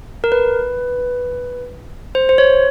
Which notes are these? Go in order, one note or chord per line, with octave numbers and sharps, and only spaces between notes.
A#4
B4
C5
C5
C#5